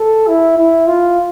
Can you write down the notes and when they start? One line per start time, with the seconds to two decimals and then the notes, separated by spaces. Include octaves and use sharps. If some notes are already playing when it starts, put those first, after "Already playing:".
Already playing: A4
0.27 E4
0.57 E4
0.87 F4